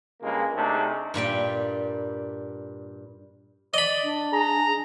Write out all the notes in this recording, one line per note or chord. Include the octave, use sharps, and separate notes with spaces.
C#2 G2 C#3 G#3 A#3
C3 A3 D4 D#4 G#4
G2 A#2 G3 G5
D5 D#5 B5
D4
G#4 A#5